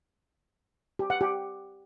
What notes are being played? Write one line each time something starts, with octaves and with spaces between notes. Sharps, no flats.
G4
F#5
G4